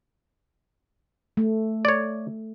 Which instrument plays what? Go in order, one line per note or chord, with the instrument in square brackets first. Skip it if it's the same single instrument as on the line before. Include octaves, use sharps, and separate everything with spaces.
[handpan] A3
[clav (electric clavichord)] C#5 D5